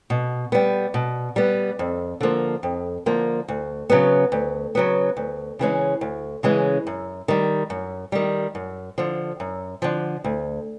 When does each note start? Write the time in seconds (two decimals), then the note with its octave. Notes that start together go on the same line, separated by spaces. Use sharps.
0.10 B2
0.52 G3 B3
0.94 B2
1.36 G3 B3
1.79 F2
2.21 D3 F3 A#3
2.63 F2
3.06 D3 F3 A#3
3.48 D2
3.90 C#3 F#3 B3
4.32 D2
4.75 C#3 F#3 B3
5.17 D2
5.59 C#3 E3 G#3 C#4
6.01 D2
6.43 C#3 E3 G#3 C#4
6.87 F#2
7.28 D#3 G3
7.70 F#2
8.12 D#3 G3
8.55 F#2
8.98 D3 F3
9.40 F#2
9.82 D3 F3
10.24 D2